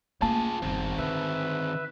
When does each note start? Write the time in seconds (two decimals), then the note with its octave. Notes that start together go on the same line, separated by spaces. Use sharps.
0.22 A3 A#3 F4 G#4 A5
0.62 G1 F2 D#3 C4
0.98 D3 B4 E5